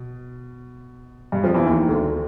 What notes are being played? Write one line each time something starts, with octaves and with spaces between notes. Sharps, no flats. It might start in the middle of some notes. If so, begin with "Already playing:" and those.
Already playing: B2
G2 G3
F2 F3
E2 E3
D#2 D#3
D2 D3